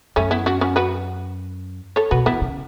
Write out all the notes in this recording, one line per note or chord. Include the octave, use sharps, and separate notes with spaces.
F#2 A3 C#4
B3 E4
C#4 F#4
C#4 F#4
F#4 B4
A4 C#5
B2 F#4 B4
E3 B3 E4
C#3